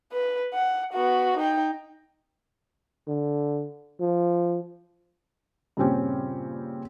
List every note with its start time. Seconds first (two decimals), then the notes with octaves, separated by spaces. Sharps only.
0.13 B4
0.54 F#5
0.93 B3 F#4
1.37 D#4 G5
3.08 D3
4.00 F3
5.77 G2 A#2 C#3 C4 C#4 G4